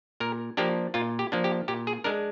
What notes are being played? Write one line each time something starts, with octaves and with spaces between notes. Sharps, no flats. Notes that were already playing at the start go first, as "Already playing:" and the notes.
A#2 A#4
F3 A#3 D4 G4
A#2 F4
G4
F3 A#3 D4
G4
A#2 G4
G#4
G#3 D4 A#4